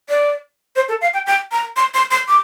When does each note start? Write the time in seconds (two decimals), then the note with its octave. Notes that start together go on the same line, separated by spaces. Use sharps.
0.09 D5
0.76 C5
0.89 A4
1.01 F5
1.14 G5
1.27 G5
1.51 A#5
1.76 C6
1.94 C6
2.11 C6
2.28 D6